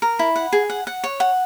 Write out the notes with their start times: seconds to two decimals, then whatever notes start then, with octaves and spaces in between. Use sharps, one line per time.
0.02 A#4
0.19 E4
0.36 F#5
0.53 G#4
0.70 F#5
0.87 F#5
1.04 C#5
1.20 F#5